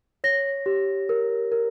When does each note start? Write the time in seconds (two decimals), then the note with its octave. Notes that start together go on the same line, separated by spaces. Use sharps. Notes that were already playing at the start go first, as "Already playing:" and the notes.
0.24 C#5 A#6
0.66 G4
1.09 A#4
1.52 A#4